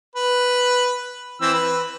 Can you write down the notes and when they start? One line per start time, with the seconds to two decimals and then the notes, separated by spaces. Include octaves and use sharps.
0.16 B4
1.41 E3 C4 E6
1.54 B4